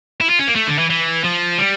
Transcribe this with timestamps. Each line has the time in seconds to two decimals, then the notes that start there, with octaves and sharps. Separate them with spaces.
0.21 E4
0.30 F4
0.39 C#4
0.47 A#3
0.55 A3
0.67 D3
0.79 E3
0.90 E3
1.24 F3
1.58 G3